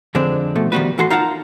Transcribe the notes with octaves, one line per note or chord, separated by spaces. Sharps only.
F2 D3 G#3 C4 D4
B2 F3 A3
D#3 F3 G3 B3 F#4 B4
A2 E3 F#4 A4 A5 C6
D#4 F4 A#4 F5 F#5 A5